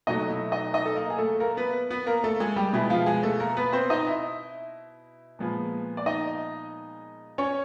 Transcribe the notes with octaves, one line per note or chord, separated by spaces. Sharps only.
B2 F#3 A3 D#4 D#5
E4 E5
D#4 D#5
D#4 D#5
A4
A#3 A#4
G#4
A3 A4
A#3 A#4
B3 B4
B3 B4
A#3 A#4
A3 A4
G#3 G#4
G3 G4
B2 G#3 B3 E4
F3 F4
G#3 G#4
A3 A4
A#3 A#4
B3 B4
C4 C5
D#4 D#5
E4 E5
A#2 F3 G#3 B3
D5
D#4 D#5
C#4 C#5